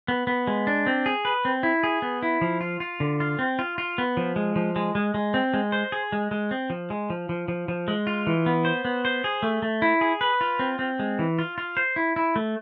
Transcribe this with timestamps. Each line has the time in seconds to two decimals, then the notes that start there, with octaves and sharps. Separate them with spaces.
0.08 B3
0.27 B3
0.47 G#3
0.67 D4
0.86 C4
1.06 G#4
1.25 B4
1.45 C4
1.63 E4
1.83 G#4
2.02 B3
2.23 E4
2.41 F3
2.61 F4
2.80 F4
3.00 D3
3.20 F4
3.39 C4
3.59 F4
3.78 F4
3.98 B3
4.17 F3
4.36 G#3
4.56 F3
4.76 G#3
4.95 G#3
5.14 G#3
5.34 C4
5.54 G#3
5.72 C5
5.92 G#4
6.12 G#3
6.31 G#3
6.51 C4
6.70 F3
6.90 G#3
7.10 F3
7.29 F3
7.48 F3
7.68 F3
7.88 G#3
8.07 F4
8.27 E3
8.46 B3
8.65 C5
8.85 B3
9.05 C5
9.24 G#4
9.43 A3
9.62 A3
9.82 E4
10.01 G#4
10.21 B4
10.41 F4
10.59 C4
10.79 C4
10.99 G#3
11.19 E3
11.39 F4
11.58 F4
11.77 C5
11.96 E4
12.16 E4
12.36 A3